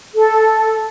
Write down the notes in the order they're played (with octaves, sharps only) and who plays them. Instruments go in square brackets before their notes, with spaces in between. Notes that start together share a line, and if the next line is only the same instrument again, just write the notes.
[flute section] A4